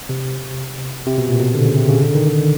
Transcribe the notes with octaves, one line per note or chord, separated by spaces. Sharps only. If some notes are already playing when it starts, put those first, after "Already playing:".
C3
C3
B2
A#2
B2
D3
C#3
C3
C#3
D3
D#3
D3